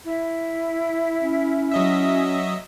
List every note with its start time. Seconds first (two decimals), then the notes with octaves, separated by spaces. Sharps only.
0.05 E4
1.22 C#4
1.72 F#3 D#5 E5